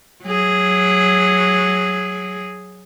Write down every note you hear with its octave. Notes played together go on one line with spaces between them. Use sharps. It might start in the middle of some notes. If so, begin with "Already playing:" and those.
F#3 G#4